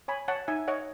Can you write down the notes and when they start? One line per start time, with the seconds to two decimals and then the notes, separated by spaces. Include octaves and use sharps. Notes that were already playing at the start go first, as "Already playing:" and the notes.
0.08 C#5 G#5 B5
0.28 C#5 F#5 A5
0.48 D#4 E5 G#5
0.68 C#5 D#5 F#5